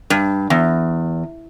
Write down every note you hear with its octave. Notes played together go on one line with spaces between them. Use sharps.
G2
E2